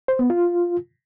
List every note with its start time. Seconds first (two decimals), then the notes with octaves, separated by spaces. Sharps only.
0.08 C5
0.19 B3
0.30 F4